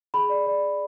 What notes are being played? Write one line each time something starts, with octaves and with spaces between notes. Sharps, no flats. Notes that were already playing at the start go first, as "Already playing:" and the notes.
G#4 B5
D5
D5
G#4